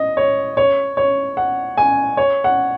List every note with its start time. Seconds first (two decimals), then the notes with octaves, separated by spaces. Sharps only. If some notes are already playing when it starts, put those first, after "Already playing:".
Already playing: D#5
0.17 C#5
0.57 C#5
0.97 C#5
1.37 F#5
1.77 G#5
2.17 C#5
2.44 F#5